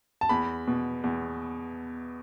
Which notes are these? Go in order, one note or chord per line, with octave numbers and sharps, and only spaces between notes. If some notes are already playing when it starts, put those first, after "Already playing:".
A5
E2 B5
B2
E2